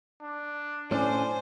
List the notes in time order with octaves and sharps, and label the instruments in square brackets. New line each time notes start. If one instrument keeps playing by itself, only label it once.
[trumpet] D4
[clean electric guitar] A2 C#4 D4 [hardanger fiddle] C5 [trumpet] D5 [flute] G#5